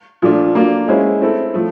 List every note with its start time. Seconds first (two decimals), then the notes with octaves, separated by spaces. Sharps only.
0.22 A#2 F3 A3 D4 F4
0.55 F#3 A#3 D4 F4
0.88 G#3 C#4 E4 G#4 C5
1.21 A3 C4 E4 A4
1.54 F3 A3